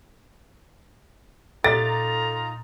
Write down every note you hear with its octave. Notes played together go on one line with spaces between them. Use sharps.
A#2 D#4 F4 A4 A#5 A6